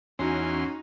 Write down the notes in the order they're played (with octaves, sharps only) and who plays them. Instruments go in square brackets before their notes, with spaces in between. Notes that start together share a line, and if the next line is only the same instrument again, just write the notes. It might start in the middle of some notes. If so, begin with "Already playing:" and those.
[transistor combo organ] E2 C6 [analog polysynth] C#4 F#4 [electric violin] D#4